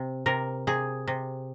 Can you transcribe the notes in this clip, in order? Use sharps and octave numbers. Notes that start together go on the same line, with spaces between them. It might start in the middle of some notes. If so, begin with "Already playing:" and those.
Already playing: C3
C3 A#4
C3 G#4
C3